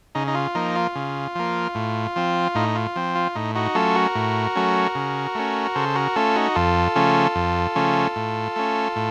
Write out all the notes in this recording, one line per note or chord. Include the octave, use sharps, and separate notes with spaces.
C#3 D#4
D#4
F4
F3 A#3 D#4
F4
C#3
F3 A#3
A2
F3 C4
A2 D#4
F4
F3 C4
F4
A2 D#4
D#4 F#4
F#3 A3 C#4 F4 A4
F#4 A#4
A2
F#3 A3 C#4
C#3
A3 C#4
C#3 A4 C5
F#4 A#4
A3 C#4 F4 A4
D#4 F#4
F2 F4 A4
C#3 F3 A3 C#4
F2
C#3 F3 A3 C#4
A2
A3 C#4
A2